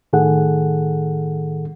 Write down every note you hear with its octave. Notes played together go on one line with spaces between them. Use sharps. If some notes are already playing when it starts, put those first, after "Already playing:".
A2 D#3 G#4 A4 F#5